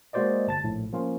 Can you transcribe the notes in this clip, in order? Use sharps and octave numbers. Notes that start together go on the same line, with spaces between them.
G#3 A#3 F#4 C5 D5 D#5
G1 A5 A6
A#1 A2
F3 A#3 C#4 F4